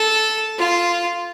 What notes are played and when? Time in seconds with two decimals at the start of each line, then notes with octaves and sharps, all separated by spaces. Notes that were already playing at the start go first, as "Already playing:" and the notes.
Already playing: A4
0.58 F4